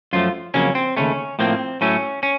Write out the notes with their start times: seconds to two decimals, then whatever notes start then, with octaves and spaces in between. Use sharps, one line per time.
0.13 F#2 F3 A3 F4
0.54 F2 C#3 F#3 A#3 C#4
0.75 C4
0.97 D#2 C#3 A3 C#4
1.39 A2 F3 A#3 C4
1.81 A2 F#3 A3 C#4
2.23 C#4